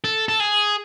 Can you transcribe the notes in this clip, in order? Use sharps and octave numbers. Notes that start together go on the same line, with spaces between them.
A4
A4
G#4